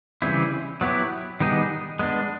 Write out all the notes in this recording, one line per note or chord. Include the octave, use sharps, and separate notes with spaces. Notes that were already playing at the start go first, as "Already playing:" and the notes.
C#3 E3 G3 C4 E4
F#3 B3 E4 G4
D#3 G3 B3 D#4 G#4
G#3 B3 D4